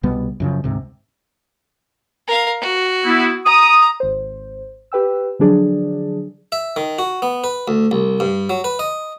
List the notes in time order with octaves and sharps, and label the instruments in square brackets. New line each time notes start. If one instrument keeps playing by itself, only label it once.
[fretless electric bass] C2 B2 G3 B3
F#2 C#3 F3
D2 G#2 C3
[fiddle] A#4 F5
F#4
[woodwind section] B3 E4
[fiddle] A#5 [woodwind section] D#6
[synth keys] G#1 C5
G4 B4 G5 E6
D3 F3 F#3 D4 G#4 D5
[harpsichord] E5
D#3
F#4
B3
B4
D2
C2
G2
F#3
B4
D#5